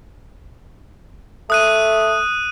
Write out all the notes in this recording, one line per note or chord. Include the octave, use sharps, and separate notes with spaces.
A3 D#6 F#6 D#7